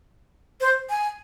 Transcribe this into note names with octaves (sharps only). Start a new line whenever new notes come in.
C5
G#5